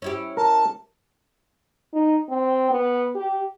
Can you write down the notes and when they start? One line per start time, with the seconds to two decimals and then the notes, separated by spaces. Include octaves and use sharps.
0.02 C#4 E4 G4
0.37 A#4 A5
1.94 D#4
2.29 C4
2.71 B3
3.15 G4